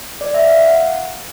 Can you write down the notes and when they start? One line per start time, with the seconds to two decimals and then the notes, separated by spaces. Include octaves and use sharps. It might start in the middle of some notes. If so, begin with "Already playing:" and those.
0.21 D5
0.34 E5
0.47 F5
0.61 F#5